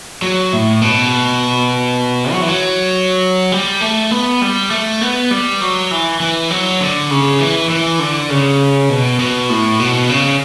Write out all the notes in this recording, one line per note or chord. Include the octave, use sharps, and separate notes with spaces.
F#3
A2
B2
F#3
E3
F#3
G3
A3
B3
G3
A3
B3
G3
F#3
E3
E3
F#3
D3
C#3
E3
E3
D3
C#3
B2
B2
A2
B2
C#3